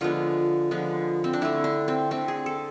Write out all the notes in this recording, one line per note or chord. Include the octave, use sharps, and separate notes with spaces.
D3 F3 G#3 B3 F4
D3 F3 G#3 B3
C4
D4
D3 A3 E4
D4
C4
D3 A3 C4
G#4
A4